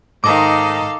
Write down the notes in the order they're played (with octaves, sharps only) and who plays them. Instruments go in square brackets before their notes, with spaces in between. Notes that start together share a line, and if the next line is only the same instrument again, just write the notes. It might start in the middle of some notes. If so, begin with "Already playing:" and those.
[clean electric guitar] G#2 [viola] D#3 D#5 [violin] A4 F5 [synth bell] D6